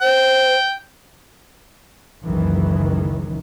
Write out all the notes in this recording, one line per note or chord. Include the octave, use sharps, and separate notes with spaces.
C5 G5
F#1 C#2 D#3 E3